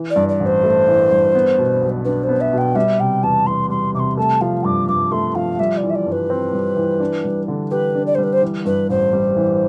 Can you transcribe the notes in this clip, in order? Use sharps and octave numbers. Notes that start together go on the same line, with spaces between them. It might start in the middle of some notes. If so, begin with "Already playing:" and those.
Already playing: E3
D5
G2
D5
A1
C5
A3
E3
G2
B3
B2
B1
D4 B4
C5
B3
E5
B2 G5
G3 E5
C3 G5
E2 A5
E2 C6
G3 C6
C3 C6 D6
A3 A5
F3 F5
G2 D6
G2 D6
A3 C6
F3 F5
G3 E5
D5
E3
E5
D5
G2
B4
C4
G3
E3
D4
G3
D3
G4 B4
D4
D5
G3 C5
B4
C5
E3
G2 B4
A1 C5
G3
E3